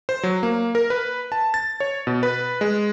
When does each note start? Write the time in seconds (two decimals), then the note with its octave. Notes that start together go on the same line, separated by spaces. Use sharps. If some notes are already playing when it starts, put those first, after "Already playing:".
0.09 C5
0.23 F#3
0.43 A#3
0.75 A#4
0.90 B4
1.32 A5
1.54 A6
1.80 C#5
2.07 B2
2.23 B4
2.61 G#3